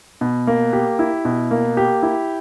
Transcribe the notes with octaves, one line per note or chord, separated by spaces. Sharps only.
B2
A#3
G4
E4
B2
A#3
G4
E4